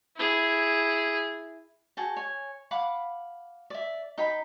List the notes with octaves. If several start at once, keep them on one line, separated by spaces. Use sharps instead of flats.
E4 G#4
F#4 G#4 G5 A5
C#5 G#5
F5 F#5 B5 D6
D5 E5
D#4 G5 B5